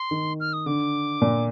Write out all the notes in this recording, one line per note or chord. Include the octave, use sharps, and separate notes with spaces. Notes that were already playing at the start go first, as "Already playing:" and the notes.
Already playing: C6
D#3
F6
D#6
D3 D6
A#2